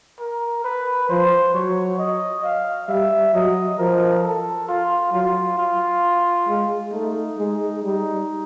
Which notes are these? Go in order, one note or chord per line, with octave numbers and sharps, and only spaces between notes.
A#4
B4
F3 C5
F#3 C#5
D#5
F5
G3 E5
F#3 D#5
F3 A#4
A4
F4
F#3 F4
F4
G#3
A3 D#4
G#3
G3 D#4